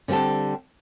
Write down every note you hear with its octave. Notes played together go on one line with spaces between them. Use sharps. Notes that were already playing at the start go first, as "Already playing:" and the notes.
D3 G3 C4 G4 A4